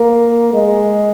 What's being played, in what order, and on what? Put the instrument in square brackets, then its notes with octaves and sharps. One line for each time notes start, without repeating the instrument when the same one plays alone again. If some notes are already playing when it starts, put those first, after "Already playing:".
Already playing: [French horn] A#3
G#3